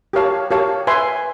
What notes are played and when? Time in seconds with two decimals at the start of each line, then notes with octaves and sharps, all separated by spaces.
0.13 G4 A#4 C#5 F5 A5
0.51 G4 A#4 C#5 F5 A5
0.87 B4 E5 G#5 C6